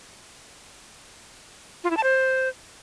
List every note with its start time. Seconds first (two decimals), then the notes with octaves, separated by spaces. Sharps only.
1.84 F4
1.90 E4
1.97 A5
2.03 C5